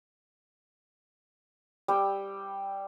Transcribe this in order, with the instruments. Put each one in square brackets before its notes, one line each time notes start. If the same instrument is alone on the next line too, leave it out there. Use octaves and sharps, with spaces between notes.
[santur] G3 G5 E6